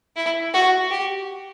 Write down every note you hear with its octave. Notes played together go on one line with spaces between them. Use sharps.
E4
F#4
G4